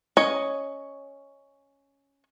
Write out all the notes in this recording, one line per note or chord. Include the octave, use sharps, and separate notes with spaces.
C#4 C#5 D#5